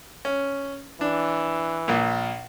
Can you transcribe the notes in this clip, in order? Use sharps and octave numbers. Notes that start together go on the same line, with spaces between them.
C#4
E3 D4
A#1 A#2